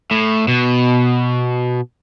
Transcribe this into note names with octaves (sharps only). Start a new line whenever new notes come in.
A2
B2